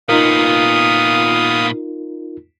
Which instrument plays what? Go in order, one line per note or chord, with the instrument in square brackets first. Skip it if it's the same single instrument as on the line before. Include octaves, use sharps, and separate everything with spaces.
[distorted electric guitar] A#2 B3 [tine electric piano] D#4 F4 A#4 [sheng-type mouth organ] F5 D#6